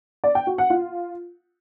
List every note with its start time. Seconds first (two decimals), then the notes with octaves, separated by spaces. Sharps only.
0.24 D5
0.35 G5
0.47 F#4
0.58 F#5
0.70 F4